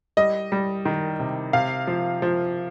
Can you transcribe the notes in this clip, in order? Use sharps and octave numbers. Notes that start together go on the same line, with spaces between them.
G3 D#5
G3
D#3
C3
C3 F5
F3
F3